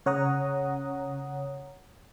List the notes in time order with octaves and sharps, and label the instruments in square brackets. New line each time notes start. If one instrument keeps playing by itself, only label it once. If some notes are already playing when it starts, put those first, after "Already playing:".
[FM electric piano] C#3 C#5 F#5 A#5 D#6